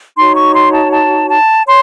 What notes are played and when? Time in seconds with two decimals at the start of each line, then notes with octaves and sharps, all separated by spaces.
0.17 D#4 F#4 C#5 C6
0.36 C#6
0.55 C6
0.73 A5
0.92 A5
1.29 A5
1.66 C#5 C6